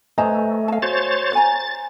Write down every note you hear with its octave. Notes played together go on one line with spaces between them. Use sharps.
A3 B4 C5 D#5 G#5 A#5
F5 A5
F#4 C5 C#5 A6
C#5 G#5 A#5 A6